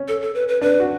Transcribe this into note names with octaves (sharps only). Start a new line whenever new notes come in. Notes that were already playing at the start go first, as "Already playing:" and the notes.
Already playing: C#4
A4
A4
B4
B4
D4 B4
F#4